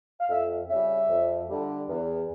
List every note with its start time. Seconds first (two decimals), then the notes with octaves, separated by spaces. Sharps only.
0.21 F5
0.29 F2 E5
0.69 C#3 G3 E5
1.09 F2
1.49 D3 G3
1.89 E2